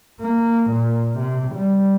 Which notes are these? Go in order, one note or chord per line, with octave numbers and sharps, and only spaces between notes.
A#3
A#2
C3
G3